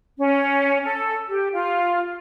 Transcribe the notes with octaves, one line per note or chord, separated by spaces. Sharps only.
C#4
A4
G4
F4